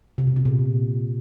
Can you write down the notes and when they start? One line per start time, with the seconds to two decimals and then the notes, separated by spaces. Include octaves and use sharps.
0.18 C3
0.27 B2
0.36 C3
0.45 A#2